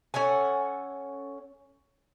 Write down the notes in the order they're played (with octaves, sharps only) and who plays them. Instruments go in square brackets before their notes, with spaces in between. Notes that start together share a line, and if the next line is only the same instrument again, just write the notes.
[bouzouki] C#4 A4 F#5 G#5